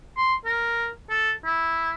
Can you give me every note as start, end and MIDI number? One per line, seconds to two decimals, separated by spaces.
0.17 0.34 84
0.45 0.87 70
1.10 1.31 69
1.45 1.93 64